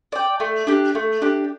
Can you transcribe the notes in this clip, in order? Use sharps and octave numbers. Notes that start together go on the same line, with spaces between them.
D5 G5
A3
D4 G4
A3
D4 G4